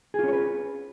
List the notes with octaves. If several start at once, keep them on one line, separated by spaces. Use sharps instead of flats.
C#4 F4 G#4 B4 C#5